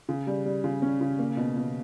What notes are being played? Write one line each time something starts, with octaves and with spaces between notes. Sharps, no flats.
C#3
G3
G3
C#3
C#4
C#3
A#3
B2
B2